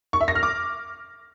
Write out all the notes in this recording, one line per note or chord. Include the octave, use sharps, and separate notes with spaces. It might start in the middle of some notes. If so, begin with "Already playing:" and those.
C#6
E5
A#6
F6
D6